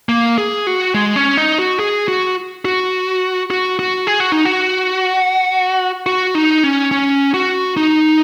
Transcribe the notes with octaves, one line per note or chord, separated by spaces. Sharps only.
A#3
G#4
F#4
G#3
C#4
D#4
F#4
G#4
F#4
F#4
F#4
F#4
G#4
F#4
D#4
F#4
F#4
D#4
C#4
C#4
F#4
D#4